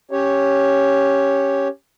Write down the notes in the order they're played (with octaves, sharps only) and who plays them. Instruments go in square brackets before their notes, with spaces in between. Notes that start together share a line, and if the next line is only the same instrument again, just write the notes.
[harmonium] C#4 G4 C#5